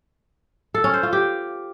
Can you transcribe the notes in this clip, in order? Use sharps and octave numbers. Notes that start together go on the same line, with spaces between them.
A4
C#4
C5
F4
G4